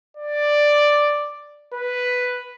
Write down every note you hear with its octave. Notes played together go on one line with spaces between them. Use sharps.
D5
B4